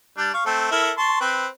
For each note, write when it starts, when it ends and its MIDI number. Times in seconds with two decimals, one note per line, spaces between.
0.18 0.30 55
0.18 0.30 62
0.34 0.41 77
0.34 0.41 85
0.46 0.68 57
0.46 0.68 60
0.46 0.68 69
0.72 0.91 64
0.72 0.91 69
0.72 0.91 70
0.98 1.19 81
0.98 1.19 84
0.98 1.19 85
1.21 1.46 60
1.21 1.46 71